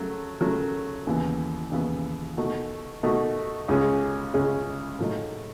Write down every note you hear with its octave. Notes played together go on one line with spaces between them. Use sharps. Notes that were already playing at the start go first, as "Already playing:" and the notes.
Already playing: C#3 F#3 A3
C#3 F#3 A3
D#2 C#3 E3 B3
D#2 C#3 E3 B3
B2 A3 D#4 F#4
B2 A3 D#4 F#4
C#2 C#3 G#3 C#4 G#4
C#2 C#3 G#3 C#4 G#4
A2 F#3 A3 D#4